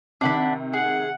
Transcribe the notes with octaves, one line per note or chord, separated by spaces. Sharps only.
C3 D#3 D4 F#5 B5
G#4 F#5